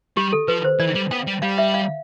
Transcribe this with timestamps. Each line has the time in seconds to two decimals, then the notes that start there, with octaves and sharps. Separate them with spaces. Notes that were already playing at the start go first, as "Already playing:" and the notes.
0.17 G3 G4
0.33 A4
0.48 F3 B4
0.65 C5
0.79 E3 D5
0.95 G3
1.11 B3 G5
1.27 G3
1.42 G3 F5
1.58 E5
1.74 F5